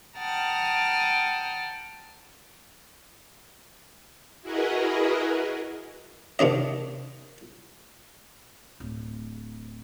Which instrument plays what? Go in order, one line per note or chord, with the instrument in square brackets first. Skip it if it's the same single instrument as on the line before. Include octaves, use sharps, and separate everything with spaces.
[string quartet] F#5 G5 A5 A#5 D#6 F6
[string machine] E4 F#4 G#4 A#4 B4 D#5
[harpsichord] C3 D#3 D4 D#5
[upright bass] D1